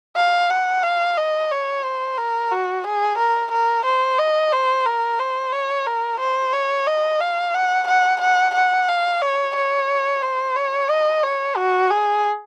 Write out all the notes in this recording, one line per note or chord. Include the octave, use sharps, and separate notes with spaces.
F5
F#5
F5
D#5
C#5
C5
A#4
F#4
G#4
A#4
A#4
C5
D#5
C5
A#4
C5
C#5
A#4
C5
C#5
D#5
F5
F#5
F#5
F#5
F#5
F5
C#5
C#5
C5
C#5
D#5
C#5
F#4
G#4